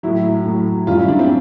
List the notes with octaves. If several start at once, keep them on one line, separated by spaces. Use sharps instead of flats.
A2 F#3 E4
A2 F#3
F#2 D#3 G3 F4
E4
D4
C4